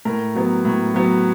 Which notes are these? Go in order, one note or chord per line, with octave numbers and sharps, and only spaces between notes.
A2 A#4 A#5
F#3 B3
A2
F#3 B3